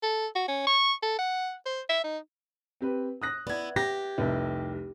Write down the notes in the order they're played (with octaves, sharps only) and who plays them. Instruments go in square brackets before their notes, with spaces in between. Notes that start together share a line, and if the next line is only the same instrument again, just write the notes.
[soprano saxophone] A4
F#4
C#4
C#6
A4
F#5
C5
E5
D#4
[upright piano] C4 G4 B4
D#6 F#6 A#6
[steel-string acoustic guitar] B3 E4 [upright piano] D5 G#6
[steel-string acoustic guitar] G4 [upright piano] A#6
[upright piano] F1 C2